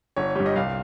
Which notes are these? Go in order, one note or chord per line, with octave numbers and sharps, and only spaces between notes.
G1 C#5
G2 G3
D#5
C2 F5